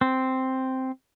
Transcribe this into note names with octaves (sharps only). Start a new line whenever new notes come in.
C4